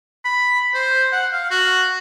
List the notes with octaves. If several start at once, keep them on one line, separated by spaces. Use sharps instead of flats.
B5
C5
F#5
F5
F#4